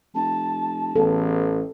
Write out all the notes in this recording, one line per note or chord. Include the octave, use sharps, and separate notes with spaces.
F1 A5
A1 E2 A4